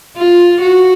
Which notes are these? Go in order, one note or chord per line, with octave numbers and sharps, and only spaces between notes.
F4
F#4